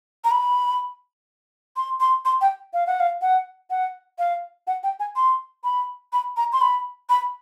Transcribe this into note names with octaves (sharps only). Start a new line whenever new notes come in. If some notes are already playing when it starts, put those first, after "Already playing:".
A#5
B5
C6
C6
C6
G5
F5
F#5
F5
F#5
F#5
F5
F#5
G5
G#5
C6
B5
B5
A#5
C6
B5
B5